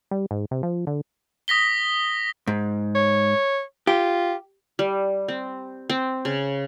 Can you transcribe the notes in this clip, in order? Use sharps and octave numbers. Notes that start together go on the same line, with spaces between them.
G3
G#2
C3
F3
D3
D#6 A#6 B6 G7
G#2
C#5
F4 G4
G3
C4
C4
C#3